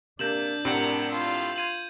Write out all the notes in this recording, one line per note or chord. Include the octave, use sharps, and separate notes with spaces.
C3 A#3 D4 G6 E7 F#7
A2 C3 C4 A#4 F#5
F4
G#6 D#7 F#7